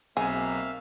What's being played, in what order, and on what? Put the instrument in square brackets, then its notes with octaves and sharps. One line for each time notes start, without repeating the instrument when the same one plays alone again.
[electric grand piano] B1 G#5 [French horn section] A#3 C4 [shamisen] G#4 [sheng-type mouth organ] E5 F5